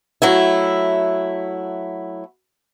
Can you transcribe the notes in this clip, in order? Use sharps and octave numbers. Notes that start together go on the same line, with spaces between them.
F#3 A3 E4